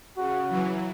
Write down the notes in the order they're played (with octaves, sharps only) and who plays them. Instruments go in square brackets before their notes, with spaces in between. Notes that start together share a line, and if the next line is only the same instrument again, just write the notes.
[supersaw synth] C#3 [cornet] F#4
[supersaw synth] E3 F#3